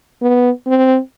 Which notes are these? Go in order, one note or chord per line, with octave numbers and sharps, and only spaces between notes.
B3
C4